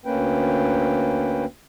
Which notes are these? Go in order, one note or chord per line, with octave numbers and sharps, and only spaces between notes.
D2 A#3 C#4 B4 G5